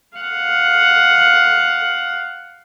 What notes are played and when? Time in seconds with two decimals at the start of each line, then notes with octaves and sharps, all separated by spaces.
0.18 F5 F#5